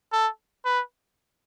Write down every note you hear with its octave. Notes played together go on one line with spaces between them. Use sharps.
A4
B4